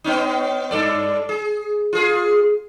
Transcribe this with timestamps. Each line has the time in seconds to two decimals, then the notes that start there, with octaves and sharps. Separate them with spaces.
0.04 B3 C#4 D#4
0.71 G2 A4 D5
1.29 G#4
1.93 F4 G#4